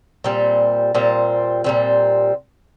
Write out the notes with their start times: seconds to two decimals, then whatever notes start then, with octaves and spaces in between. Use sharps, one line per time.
0.24 A#2 G3 C4
0.95 A#2 G3 C4
1.64 A#2 G3 C4